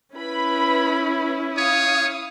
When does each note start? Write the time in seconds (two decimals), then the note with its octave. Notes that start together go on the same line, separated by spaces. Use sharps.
0.15 C#4 E4 B4 B5
1.58 C#5 F5 D#6